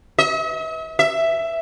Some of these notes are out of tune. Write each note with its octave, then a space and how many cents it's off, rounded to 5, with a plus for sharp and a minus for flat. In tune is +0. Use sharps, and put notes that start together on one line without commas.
E5 -45
E5 +5